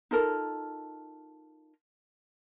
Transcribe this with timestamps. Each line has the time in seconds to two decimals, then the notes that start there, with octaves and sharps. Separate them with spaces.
0.11 D#4 F4 A4 A#4